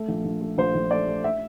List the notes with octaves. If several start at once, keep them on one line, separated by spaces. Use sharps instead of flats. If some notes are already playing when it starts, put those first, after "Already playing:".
Already playing: A3
A#1
A#1
A3
A#1 C5
A#1
A3 D5
A3
E5